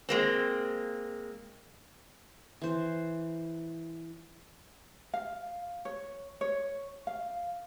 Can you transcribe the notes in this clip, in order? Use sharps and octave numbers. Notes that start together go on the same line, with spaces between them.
G#3 A#3 C4
E3 C5
F5
C#5
C#5
F5